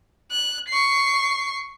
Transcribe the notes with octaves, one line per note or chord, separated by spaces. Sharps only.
F#6
C#6 C7